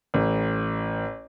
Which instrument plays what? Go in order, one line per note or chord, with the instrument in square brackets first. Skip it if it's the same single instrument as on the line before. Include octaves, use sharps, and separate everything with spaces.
[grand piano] A1